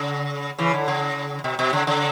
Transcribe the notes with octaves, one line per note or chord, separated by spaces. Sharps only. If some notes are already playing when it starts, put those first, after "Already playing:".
Already playing: C#3
C#3 E3
D3
C#3
B2
B2
C#3
C#3